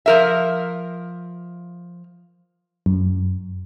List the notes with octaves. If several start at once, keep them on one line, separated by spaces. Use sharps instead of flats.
F3 A#4 E5
F#2